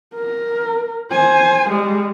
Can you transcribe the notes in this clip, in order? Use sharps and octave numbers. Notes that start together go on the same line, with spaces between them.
A#4
C5 G#5
G3 G#3